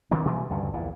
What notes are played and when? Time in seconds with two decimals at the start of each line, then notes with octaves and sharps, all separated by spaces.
0.11 D#3 F#3 C4 D4
0.25 B2 E3 G3 A#3
0.50 D2 G2 C#3 G3
0.74 A#1 E2 A#2 E3